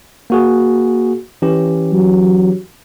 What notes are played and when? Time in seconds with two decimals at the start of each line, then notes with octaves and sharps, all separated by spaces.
0.30 A#3 F#4 G#4
1.42 E3 C#4 G4
1.92 F#3